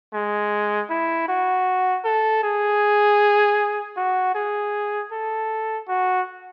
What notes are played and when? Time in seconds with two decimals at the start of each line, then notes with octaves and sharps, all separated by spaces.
0.14 G#3
0.90 E4
1.28 F#4
2.05 A4
2.44 G#4
3.97 F#4
4.35 G#4
5.12 A4
5.88 F#4